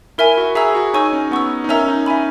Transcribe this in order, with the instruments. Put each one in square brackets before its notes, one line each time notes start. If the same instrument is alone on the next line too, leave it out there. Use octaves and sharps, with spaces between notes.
[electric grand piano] E4 [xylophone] A#4 E5 G#5
[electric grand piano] F#4
[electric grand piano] G#4 [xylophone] E5 A#5 E6
[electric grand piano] F#4
[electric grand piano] D#4 [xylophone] C#5 G#5 C#6 E6
[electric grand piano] C#4
[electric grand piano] B3 [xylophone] F#5 C#6 E6
[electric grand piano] D#4
[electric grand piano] C#4 [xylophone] A#4 E5 A#5 E6
[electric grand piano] D#4
[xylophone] E5 G#5 B5